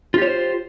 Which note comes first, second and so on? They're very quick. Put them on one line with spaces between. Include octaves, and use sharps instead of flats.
F4 G4 C#5 C5